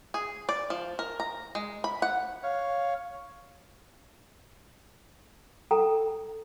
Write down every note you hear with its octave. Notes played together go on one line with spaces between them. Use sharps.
G#4
D5
F3
A#4
A#5
G#3
B5
F#5
C#5 F5
A4 G5 A#5